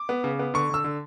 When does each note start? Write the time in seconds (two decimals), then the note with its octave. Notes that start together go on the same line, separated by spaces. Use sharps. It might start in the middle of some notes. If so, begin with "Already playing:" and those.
Already playing: D6
0.09 B3
0.24 C#3
0.39 B3
0.54 D3 C#6
0.70 D3 E6
0.84 D3